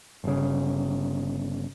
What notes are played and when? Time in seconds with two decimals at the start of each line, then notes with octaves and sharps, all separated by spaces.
0.24 G1 C#3